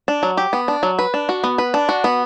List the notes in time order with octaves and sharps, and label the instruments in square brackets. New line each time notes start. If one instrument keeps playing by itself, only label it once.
[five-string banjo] D4
F#3
G4
B3
D4
F#3
B4
D4
F#4
B3
B4
D4
F#4
B3